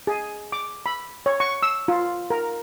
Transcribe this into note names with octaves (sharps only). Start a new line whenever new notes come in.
G#4
D6
B5
C#5
C#6
E6
F4
A#4